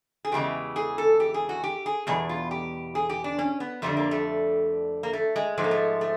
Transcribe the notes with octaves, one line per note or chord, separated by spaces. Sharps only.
G#4
E2 C#3 E3 G#3 G4
G#4
A4
G4
G#4
F#4
G4
G#4
E2 B2 G3 G#4
F4
G4
G#4
G4
D4
C#4
B3
F2 D3 G3 A3
A#3
A3
A#3
A3
G#3
G#2 F3 G#3 A3
A#3
A3
A3